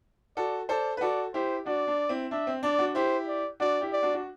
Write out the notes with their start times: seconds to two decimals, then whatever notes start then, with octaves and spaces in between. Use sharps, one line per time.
0.36 F#4 A4 D5
0.69 A4 C5 D5
0.97 B4
1.01 F#4 A4 D5
1.34 E4 G4 C5
1.66 D4 F#4 D5
1.87 D4
2.09 C4 E4
2.31 D4 E5
2.47 C4
2.63 D4 D5
2.79 D4 F#4
2.95 E4 G4 C5
3.27 D5
3.60 D4 F#4 D5
3.81 E4 G4
3.92 D5
4.03 D4 F#4
4.14 F#4